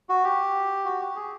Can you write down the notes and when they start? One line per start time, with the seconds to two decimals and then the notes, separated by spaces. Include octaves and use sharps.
0.09 F#4
0.24 G4
0.85 F#4
1.01 G4
1.16 G#4